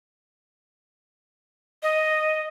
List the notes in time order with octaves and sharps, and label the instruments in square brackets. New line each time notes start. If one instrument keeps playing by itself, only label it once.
[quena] D#5